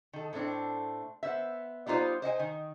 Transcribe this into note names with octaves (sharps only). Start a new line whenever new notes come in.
D#3 A4
A2 A3 C4 D4
B3 C5 E5
G3 B3 D#4 F4 C5 D5
C5 D#5 F#5 G#5
D#3